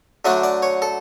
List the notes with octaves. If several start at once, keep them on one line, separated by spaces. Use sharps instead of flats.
D3 F#3 A3 D4 E5
D5
C#5
A4